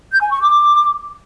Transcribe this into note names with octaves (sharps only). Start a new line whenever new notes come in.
G6
G#5
C#6
D6